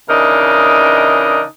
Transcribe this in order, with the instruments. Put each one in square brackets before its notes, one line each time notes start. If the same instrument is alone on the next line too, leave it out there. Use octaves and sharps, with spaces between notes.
[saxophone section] C#3 E3 D4 D#4 A#4 D#5